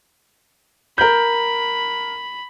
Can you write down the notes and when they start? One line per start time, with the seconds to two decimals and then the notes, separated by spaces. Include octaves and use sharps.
0.98 A#4 B5 G6